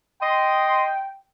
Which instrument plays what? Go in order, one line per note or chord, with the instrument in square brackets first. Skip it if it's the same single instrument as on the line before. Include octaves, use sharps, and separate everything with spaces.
[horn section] D#5 C6 [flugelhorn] G5